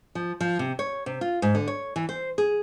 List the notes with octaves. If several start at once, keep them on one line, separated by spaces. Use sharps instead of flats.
F3
F3
C3
C#5
C3
F4
G#2
D3
C#5
E3
C5
G#4